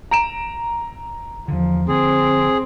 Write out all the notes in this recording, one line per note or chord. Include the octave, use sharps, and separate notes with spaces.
A#5 D7 E7
E2 D3 F3
D3 E3 F3 C4 G#4